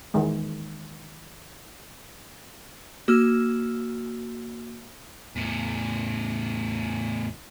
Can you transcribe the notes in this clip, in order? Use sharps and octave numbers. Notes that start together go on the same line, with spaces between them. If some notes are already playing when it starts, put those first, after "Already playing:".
D#3 E3 G#3
A#3 F#4 E6 F6
E2 A2